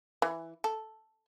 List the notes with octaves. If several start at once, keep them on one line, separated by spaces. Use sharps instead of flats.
E3
A4